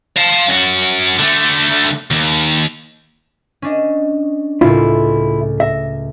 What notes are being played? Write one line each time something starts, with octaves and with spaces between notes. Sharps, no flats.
F5 A5
F#2 F#4
D3 A3
D#2
C#4 D4 D#5
C#2 A2 E4 F4
E5 A#6